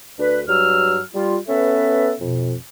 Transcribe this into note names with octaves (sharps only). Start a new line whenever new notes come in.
D2 D4 B4
G2 F#3 E6 F6
G3 F4
B3 C#4 A4 B4 E5
F2 B2